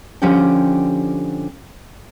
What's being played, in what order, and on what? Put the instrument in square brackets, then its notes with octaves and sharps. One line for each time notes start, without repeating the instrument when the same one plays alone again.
[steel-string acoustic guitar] D3 F3 C#4 G4 F#5 G5